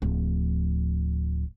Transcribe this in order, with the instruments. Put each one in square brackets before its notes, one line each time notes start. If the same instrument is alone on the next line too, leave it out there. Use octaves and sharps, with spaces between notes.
[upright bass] D1 F3